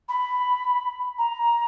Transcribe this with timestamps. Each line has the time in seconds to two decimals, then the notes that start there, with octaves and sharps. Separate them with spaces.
0.09 B5
1.18 A#5